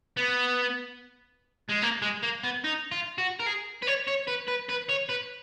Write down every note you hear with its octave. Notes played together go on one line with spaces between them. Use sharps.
B3
G#3
A#3
G#3
A#3
B3
D#4
F4
F#4
A#4
G#4
B4
C#5
C#5
B4
B4
B4
C#5
B4